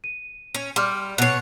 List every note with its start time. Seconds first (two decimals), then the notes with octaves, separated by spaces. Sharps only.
0.04 D#7
0.55 C#4
0.76 G3 C6 D6 F6
1.18 B2 C#5 F#6 C7